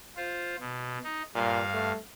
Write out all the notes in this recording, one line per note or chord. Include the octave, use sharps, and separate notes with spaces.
F4 C5
B2
D#4
G2 A#2 F5
A3